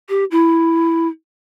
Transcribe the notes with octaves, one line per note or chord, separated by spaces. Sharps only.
G4
E4